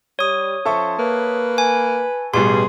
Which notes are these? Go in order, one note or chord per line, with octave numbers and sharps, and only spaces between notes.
G3 C#5 D#6
F3 C#4 A4 C5 E5 C#6
A#3 B4
G#5
A1 B2 G3 G#4 C6